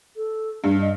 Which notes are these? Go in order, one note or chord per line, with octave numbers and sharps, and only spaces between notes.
A4
G2 D4
D#5